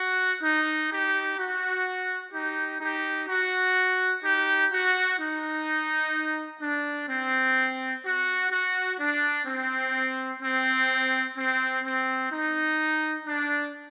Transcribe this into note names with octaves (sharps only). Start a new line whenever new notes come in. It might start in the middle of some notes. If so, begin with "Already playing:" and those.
Already playing: F#4
D#4
D#4 G4
F#4
D#4 G4
D#4 G4
F#4
D#4 G4
F#4
D#4
D4
C4
F#4
F#4
D4
C4
C4
C4
C4
D#4
D4